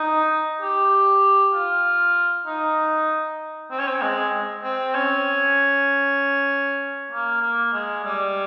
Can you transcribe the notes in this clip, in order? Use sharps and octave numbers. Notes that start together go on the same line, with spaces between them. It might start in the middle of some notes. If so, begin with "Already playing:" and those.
Already playing: D#4
G4
F4
D#4
C4
C#4
C4
G#3
C4
C#4
A#3
A#3
G#3
G3